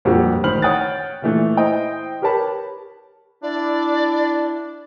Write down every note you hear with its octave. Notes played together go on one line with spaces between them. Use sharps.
G1 F2 A#2 A#3 F#4 G4
A1 D#3 C5 B5 F6 F#7
C#5 F#5 G5 D#6 F#6 A6
A#2 E3 A3
E4 C5 D#5 G5
G4 A#4 B4 C#5 A5 B5
D4 E4 D5